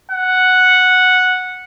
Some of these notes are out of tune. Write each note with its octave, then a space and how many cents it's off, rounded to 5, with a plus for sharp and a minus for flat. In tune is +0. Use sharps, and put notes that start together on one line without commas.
F#5 -5